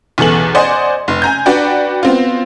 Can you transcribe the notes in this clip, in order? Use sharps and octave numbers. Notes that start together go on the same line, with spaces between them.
B1 E2 E3 A4 F#7
C5 D5 D#5 F#5 G#5 C6
F1
G#5 A#5 G6
D4 F#4 B4 D5 G5
B3 C4 F4